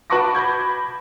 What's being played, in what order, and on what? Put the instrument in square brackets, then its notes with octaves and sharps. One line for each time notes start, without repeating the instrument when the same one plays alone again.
[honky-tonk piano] F#4 B4 A5 C#6 D6 A#6
B5 D6 G6 G#6